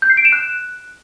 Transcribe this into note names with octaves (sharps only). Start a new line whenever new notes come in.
G6
C7
D7
E7
F#6